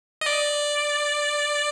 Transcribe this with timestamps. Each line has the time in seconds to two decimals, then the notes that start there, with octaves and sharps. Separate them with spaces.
0.21 D#5
0.26 D5